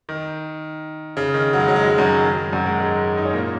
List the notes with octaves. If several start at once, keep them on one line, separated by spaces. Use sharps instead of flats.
D#3
C#3
D#3
F#3
G#3
F#3
G#3
F#3
G#3
F#2 F#3
D#3
F#2 F#3
G#2 G#3
G#2 G#3
D#4
C#4
A#2 A#3